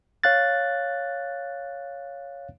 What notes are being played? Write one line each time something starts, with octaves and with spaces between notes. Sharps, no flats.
C#5 F5 F#6 A6